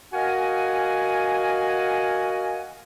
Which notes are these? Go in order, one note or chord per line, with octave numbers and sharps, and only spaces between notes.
F#4 A#4 D#5 F5 F#5 G#5